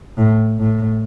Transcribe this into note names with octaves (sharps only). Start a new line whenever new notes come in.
A2
A2